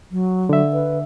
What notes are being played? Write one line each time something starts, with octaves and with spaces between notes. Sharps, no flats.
F#3
D3 E5
B4